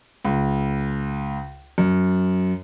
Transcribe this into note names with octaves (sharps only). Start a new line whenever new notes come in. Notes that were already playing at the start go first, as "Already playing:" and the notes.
C#2
F#2